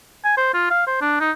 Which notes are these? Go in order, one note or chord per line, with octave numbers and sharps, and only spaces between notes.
G#5
C5
F4
F5
C5
D4
D#4